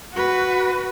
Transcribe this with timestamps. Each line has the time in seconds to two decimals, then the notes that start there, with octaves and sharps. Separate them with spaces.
0.13 F#4 B4